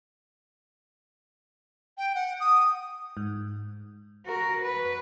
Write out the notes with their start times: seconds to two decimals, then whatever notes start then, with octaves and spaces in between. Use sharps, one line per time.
1.98 G5
2.15 F#5
2.40 D#6
3.17 G#2
4.26 F#4 A#4
4.62 B4